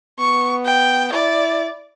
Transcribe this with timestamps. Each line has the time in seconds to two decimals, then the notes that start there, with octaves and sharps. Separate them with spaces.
0.19 B3 C#6
0.66 G5
1.13 E4 D5